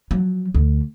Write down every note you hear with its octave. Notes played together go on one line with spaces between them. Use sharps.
F3 F#3
D2 D3